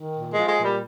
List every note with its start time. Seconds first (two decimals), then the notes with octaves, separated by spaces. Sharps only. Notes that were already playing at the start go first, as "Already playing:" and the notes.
Already playing: D#3
0.15 A#2
0.31 G#3
0.37 F3
0.47 G#3
0.58 A#2
0.63 G3